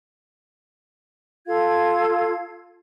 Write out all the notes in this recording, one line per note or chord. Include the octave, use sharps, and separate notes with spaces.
F4 A4 F5 G#6